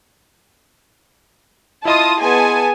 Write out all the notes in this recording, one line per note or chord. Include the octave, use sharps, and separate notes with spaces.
E4 F4 D#5 A5 C6 D#6
B3 G#4 G#5 A5